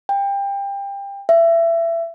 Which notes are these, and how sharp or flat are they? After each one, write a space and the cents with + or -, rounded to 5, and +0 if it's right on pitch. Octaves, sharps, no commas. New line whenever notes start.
G5 +25
E5 +25